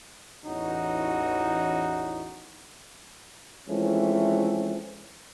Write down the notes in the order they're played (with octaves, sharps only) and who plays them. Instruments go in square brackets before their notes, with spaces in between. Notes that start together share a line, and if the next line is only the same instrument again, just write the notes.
[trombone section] A1 E2 E3 C#4 D#4 F#4
E3 F3 G#3 A3 C4 C#4